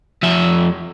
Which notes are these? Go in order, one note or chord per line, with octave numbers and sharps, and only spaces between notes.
F2 E5